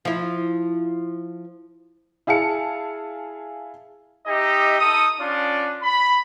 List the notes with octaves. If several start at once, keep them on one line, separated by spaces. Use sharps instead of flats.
F3 E4
E4 G#4 F5 A5 C#7
D#4 G4 D#5 E5
D#4 A4 D#6
C#4 D4 F4 D5
B5